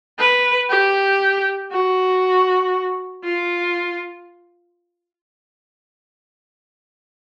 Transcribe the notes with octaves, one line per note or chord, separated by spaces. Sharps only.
B4
G4
F#4
F4